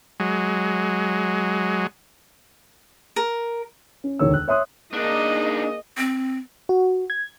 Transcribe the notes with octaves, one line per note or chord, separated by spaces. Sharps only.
F#3 G#3
A#4
C#4
E1 D2 D#3 C#5 E6
F#6
C#5 E5 C6 D#6 F#6
A#3 D4 D#4 G#4 D#5
C4
F#4
G#6